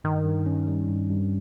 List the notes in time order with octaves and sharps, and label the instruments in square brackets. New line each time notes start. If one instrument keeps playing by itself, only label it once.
[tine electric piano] G2 [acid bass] D#3
[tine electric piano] G2
C#4
G3
G2
G2